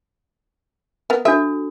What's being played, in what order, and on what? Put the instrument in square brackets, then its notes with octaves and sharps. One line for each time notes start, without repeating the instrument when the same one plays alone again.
[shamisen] B3 A#4
[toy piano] D4 F#4 A4 [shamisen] E5